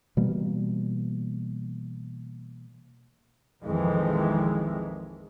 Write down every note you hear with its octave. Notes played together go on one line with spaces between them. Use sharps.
B2 E3 G3 A#3
A#1 F2 D#3 E3 G#3